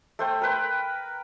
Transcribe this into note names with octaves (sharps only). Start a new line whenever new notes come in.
A3 C5 G5
A#4 B4 G5